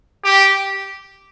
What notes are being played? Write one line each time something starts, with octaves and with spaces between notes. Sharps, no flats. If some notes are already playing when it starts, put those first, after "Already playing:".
G4